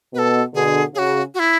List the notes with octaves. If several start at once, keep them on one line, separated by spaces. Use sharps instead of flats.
B2 A4 B4
B2 D3 G#4
C#3 F#4 G#4
F#4
E4